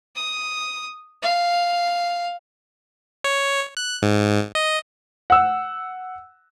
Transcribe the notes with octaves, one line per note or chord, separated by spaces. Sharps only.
D#6
F5
C#5
F#6
G#2
D#5
F#5 E6